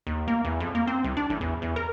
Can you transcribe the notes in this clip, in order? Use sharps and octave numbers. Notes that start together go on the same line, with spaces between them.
D#2
A#3
E2
F2
A#3
C4
C2
D4
A1
E2
E2
A#4